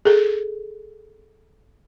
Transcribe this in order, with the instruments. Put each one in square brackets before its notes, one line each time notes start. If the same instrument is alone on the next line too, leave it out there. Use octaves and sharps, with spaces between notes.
[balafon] G#4 A4